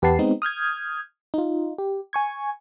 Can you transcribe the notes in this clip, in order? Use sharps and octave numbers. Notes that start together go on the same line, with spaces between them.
E2 G4 B4 F#5 A5 C7
G#3 B3 C4 D#4
D#6 F6 G6 G#6
D#4 F4
G4
G#5 C#6 G#6